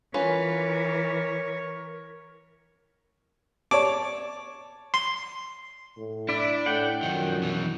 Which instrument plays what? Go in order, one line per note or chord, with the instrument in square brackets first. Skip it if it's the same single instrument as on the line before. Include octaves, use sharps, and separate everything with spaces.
[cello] E3 [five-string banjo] C#4 F4 B4 [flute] A#4 [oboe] C#5
[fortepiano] C#5 D5 A5 [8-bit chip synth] D6
[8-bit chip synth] C6
[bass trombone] A2
[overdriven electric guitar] D4 [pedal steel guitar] E4 D5
[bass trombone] A2 [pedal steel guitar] F#5 G5
[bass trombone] F#2 [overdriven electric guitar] D#3 F3
[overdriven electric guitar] B2 E3